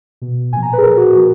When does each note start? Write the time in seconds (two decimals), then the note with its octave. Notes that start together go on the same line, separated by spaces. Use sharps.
0.22 B2
0.53 A#2 F3 G#5
0.62 A#5
0.73 B4
0.78 G#4
0.82 A#2 A#4
0.86 F3
0.97 F#4
1.12 A#2 F3 F#4